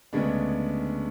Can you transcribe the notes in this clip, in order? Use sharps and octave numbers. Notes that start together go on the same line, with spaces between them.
D2 C#3 G#3 B3 D4